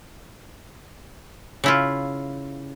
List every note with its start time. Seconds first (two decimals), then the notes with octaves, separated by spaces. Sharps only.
1.64 C#3 E4 F4